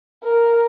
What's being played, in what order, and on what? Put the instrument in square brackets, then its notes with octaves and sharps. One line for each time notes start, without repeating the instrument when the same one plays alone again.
[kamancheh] A#4